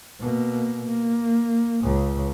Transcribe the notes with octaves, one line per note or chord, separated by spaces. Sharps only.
B2 A#3
A#3
C#2 C#3